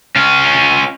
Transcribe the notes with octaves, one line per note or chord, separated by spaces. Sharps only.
C#4 F4